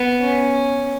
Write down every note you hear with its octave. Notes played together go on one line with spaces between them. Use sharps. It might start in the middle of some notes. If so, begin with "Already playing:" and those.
Already playing: B3
C#4